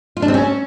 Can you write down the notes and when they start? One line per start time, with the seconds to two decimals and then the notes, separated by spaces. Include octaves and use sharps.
0.17 F4
0.22 D4
0.28 C4
0.34 C#4